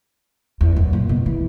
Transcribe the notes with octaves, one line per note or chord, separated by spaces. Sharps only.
E2
F#2
A#2
B2
E3